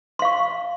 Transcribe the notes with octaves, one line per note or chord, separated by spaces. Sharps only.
F5 C6 C#6